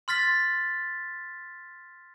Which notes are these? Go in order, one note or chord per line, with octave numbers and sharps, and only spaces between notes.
C6 F6 A6 B6